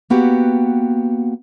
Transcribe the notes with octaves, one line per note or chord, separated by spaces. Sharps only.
A#3 B3 F#4 G4